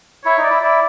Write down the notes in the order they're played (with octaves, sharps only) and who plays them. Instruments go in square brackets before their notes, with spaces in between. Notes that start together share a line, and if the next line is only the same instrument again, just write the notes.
[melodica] E4 [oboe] C#5
[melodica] D#4
[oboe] D5
[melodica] E4
[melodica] E4 [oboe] D5